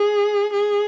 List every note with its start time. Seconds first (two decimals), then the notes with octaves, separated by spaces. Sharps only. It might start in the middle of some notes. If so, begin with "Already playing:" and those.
Already playing: G#4
0.54 G#4